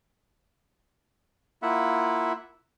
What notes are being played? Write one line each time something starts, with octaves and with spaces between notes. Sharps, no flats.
A#3 E4 F4 E5 F#5